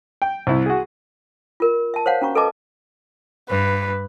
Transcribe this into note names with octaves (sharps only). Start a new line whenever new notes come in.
G5
C2 E4
F#4 G#4
F4 A#4
E5 A5
C5 C#5 F5 F#5
C#4 F#4 A#5 C#6
A4 B4 D#5 E5 A5 D6
G2 B4